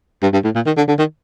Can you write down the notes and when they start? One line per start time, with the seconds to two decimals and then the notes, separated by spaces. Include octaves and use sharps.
0.23 G2
0.33 G2
0.44 A2
0.55 A#2
0.66 D#3
0.77 D3
0.88 D3
0.99 D#3